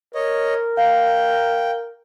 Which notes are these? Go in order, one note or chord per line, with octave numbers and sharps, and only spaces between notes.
A#4 C#5 D#5
F5 G5